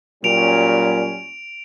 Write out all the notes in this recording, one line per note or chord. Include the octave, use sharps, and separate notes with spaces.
A#2 F#3 G3 C#4 D7 F7